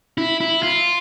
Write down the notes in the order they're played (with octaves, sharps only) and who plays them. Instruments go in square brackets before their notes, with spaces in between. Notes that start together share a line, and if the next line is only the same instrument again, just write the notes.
[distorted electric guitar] E4
E4
F4